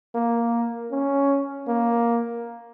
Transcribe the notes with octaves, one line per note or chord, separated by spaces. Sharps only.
A#3
C#4
A#3